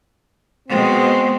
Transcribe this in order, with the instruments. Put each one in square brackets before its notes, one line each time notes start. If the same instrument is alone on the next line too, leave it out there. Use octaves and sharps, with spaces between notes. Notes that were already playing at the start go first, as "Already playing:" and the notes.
[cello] B2 G#3 [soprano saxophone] C4